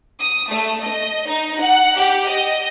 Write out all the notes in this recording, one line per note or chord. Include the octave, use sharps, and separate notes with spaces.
D#6
A3
D#5
D#4
F#5
G4
D#5